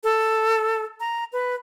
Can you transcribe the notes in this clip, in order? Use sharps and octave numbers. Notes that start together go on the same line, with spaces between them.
A4
A#5
B4